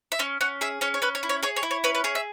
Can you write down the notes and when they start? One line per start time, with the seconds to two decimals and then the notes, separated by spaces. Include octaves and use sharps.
0.12 E5
0.19 C#4 C#5
0.41 C#4 F#5
0.61 G#4 E5
0.81 C#4 C#5
0.94 C#5
1.02 C#4 B4
1.15 C#5
1.23 E4
1.29 C#5
1.43 G#4 C#5
1.56 C#5
1.63 E4
1.71 C#5
1.84 C#4 B4
1.95 B4
2.04 G#4 C#5
2.15 E5